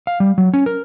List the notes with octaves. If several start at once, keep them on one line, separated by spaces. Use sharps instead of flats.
F5
G3
F#3
C#4
A#4